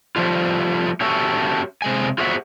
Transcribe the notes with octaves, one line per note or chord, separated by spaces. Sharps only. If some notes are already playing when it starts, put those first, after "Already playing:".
F3 G3 A3 F4
C#4 F#4 G4 A4 C#5 E5
C3 G#3 G#5
F4 F#4 G#4 C5 E5 F#5